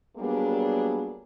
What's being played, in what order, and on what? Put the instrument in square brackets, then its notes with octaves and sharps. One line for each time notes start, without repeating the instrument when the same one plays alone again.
[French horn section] F#3 G3 A#3 B3 D4 G#4